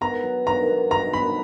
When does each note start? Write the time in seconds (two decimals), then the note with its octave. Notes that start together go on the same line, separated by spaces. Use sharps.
0.01 B3 A#5
0.23 F#3
0.46 A#4 A#5
0.68 B3
0.90 F#3 A#5
1.13 B3 B5